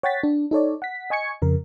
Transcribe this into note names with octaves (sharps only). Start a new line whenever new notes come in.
C#5 F#5 G5 A6 B6
D4
D#4 A4 C#5 D5
F#5 B6
D#5 G#5 C#6 G#6 C#7
F2 C#3 A#4